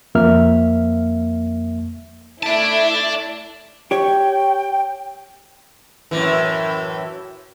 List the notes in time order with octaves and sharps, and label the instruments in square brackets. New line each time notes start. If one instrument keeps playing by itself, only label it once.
[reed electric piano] F2 A#3 E5 F6
[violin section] A3 E4 [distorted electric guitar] D5 A5
[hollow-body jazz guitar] G4 C#5 [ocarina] G5
[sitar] F#2 A2 E3